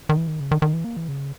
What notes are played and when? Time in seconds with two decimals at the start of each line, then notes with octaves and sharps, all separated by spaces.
0.09 D#3
0.17 E3
0.27 D#3
0.40 C#3
0.51 D#3
0.62 D#3
0.73 E3
0.84 A#3
0.97 E3
1.08 C#3